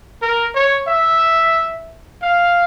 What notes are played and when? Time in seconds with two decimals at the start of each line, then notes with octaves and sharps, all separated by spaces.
0.21 A#4
0.55 C#5
0.87 E5
2.22 F5